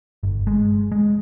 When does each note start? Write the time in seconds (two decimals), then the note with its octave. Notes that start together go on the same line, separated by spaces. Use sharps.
0.23 G1
0.47 G#3
0.92 G#3